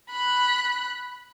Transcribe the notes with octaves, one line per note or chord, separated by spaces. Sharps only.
B5 F#6